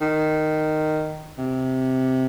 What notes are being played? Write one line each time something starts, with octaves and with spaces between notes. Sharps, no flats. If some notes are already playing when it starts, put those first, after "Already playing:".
D#3
C3